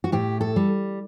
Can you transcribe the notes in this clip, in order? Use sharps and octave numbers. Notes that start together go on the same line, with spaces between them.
F#4
A2 G4
A4
G3